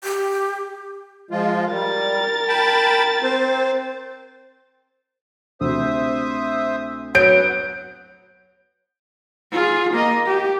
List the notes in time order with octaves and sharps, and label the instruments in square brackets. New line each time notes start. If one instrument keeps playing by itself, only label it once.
[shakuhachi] G4
[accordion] F3 G#3 F4
[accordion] G3 [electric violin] A#4 A6
[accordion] G5 A5 B5
C4 C5
[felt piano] D2 C3 [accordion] C5 E5 D#6
[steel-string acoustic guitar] F#3 [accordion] B3 F#5 [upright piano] G6 D7
[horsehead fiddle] F4 G#4
A#3 D#5
G4